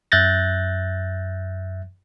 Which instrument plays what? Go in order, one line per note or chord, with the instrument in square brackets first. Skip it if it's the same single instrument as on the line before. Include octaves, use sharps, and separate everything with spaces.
[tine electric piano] F#2 E5 F#6 G6 A6 A#6